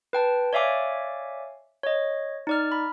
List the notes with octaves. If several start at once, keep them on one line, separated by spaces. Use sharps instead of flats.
B4 G5 A5
C#5 D5 E5 F5 G#5 D6
C#5 D#5
D#4 D5 F6
B5